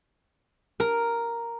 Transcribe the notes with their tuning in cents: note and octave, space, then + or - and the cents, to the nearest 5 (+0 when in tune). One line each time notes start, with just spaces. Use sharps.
A#4 +0